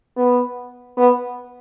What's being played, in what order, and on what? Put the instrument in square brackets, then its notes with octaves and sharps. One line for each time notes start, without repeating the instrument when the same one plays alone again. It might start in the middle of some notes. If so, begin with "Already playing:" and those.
[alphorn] B3
B3